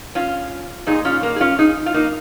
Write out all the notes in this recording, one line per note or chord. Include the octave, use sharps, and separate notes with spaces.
C#4 F4
A#2 G#3 D#4 G#4
C#4 F4
A#3
G#4
C#4 F4
D#4 G#4
F4
A#3 D#4